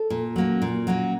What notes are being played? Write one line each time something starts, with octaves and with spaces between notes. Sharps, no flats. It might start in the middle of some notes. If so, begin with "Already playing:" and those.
Already playing: A4
A#2
F#3 A#3 C#4
A#2
F#3 A#3 C#4